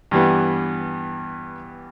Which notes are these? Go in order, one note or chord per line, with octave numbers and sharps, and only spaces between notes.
G2 E3 G3 B3